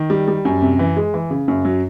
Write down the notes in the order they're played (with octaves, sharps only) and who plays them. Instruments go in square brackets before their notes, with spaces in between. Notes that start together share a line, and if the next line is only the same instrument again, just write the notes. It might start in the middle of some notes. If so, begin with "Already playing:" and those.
Already playing: [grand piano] D#3
G3
G3
F#2
C3
E3
G#3
E3
C#3
F#2
F#3